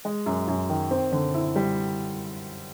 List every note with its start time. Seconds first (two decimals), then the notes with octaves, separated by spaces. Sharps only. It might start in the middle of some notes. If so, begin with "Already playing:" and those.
0.05 G#3
0.26 F#2
0.48 F#2
0.70 D#3
0.91 C4
1.12 D3
1.34 E4
1.56 G3